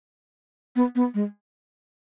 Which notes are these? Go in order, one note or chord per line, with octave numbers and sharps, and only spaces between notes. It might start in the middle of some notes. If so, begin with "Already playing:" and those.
B3
B3
G#3